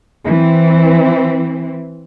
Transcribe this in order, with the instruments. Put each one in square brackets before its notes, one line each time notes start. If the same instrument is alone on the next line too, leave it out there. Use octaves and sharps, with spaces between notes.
[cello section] E3 C4